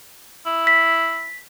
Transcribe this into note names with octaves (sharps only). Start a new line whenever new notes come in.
E4
B6